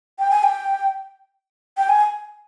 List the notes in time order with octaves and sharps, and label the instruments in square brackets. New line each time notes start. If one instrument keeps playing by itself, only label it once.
[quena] G5
G#5
G5
G5
G#5